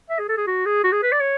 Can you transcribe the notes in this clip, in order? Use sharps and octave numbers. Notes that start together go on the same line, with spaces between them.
E5
G#4
A4
G#4
F#4
G#4
F#4
G#4
B4
D5
C#5